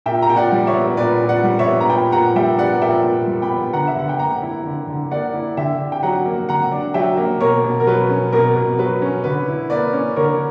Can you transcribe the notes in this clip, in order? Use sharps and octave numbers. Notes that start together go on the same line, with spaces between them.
A#2 E5 G5
A#5
A#2 G5
D5 F#5
G3
C#5 E5
B3
A#2 B4 D5
A#2
D5 F#5
G3
C#5 E5
B3
A#5
A#2 G5 B5
A#2 F#5 A#5
G3 E5 G5
B3 D5 F#5
A#2 E5 G5
A#2
G3
G5 B5
B3
D3 F#5 A#5
E5
D3 F#5
G5
A#3 F#5 A#5
E4
D3
D3
A#3 D5 F#5
E4
D3 E5 G5
D4
G5
F#3 F#5 A#5
A#3
D3 F#5 A#5
D4
F#3 E5 G5
A#3
B2 A#4 C#5
B2
A#4
F#3 B4
C#4
B2 A#4
B2
F#3 B4
C#4
D3 B4
E4
A#3 B4 D5
C#4
D3 A#4 C#5